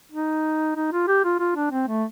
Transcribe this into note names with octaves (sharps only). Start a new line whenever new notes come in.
D#4
D#4
F4
G4
F4
F4
D4
C4
A3